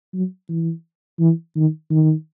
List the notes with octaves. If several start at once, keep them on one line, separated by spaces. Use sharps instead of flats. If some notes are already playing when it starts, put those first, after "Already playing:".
F#3
E3
E3
D#3
D#3